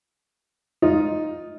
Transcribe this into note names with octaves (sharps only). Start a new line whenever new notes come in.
D#4 F4